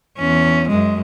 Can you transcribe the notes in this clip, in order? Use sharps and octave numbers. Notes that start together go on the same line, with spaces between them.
E2 C#4
F#2 G#3